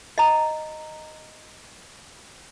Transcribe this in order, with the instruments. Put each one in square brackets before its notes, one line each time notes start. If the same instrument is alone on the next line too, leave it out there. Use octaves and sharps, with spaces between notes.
[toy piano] D#5 A#5